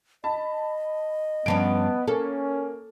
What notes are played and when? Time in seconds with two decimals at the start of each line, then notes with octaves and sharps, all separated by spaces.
0.24 D#5 A5 B5
1.46 G2 F3 B3 C#4 A5 D7
2.08 A#3 C#4 A4